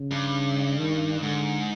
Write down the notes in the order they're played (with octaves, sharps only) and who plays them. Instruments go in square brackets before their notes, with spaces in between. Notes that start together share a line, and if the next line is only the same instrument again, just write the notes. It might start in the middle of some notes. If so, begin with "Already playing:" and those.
Already playing: [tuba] C#3
[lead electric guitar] G2
[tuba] D#3
[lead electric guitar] G#2 [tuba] D3